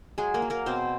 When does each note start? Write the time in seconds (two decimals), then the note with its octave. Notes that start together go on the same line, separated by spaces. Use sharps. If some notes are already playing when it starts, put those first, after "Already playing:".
0.18 F#3 G#3 G#4
0.34 A#3 A#4
0.42 F#3
0.50 A#3 A#4
0.66 B2 C4 C5